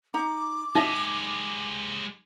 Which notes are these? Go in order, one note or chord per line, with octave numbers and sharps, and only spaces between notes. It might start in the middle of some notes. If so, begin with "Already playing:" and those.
D#4 A#5 D6
G#3 D#4 G4 D#5 E5